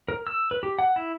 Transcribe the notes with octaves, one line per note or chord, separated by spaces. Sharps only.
A#4
E6
B4
G4
F#5
E4